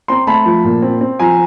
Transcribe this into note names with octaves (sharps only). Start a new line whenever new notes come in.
C4 A#5 C6
A3 A5 B5
F3
A#2
C4
C4
F3 G#5 A#5